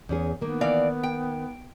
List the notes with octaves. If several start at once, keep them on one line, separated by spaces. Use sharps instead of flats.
E2 C#4 G#4
D#3 A#3 B3
E3 D5 F5
G5